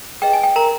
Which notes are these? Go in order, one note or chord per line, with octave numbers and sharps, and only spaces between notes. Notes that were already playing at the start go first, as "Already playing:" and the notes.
G#4 B4 D#5 G5
G#5
G5
A#4 A#5